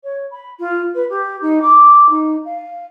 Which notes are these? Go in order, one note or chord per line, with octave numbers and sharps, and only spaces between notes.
C#5
B5
F4
B4
G4
D#4
D6
D#4
F5